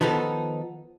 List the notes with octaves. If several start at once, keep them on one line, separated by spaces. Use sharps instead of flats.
D#3 F3 B3 D#4 A4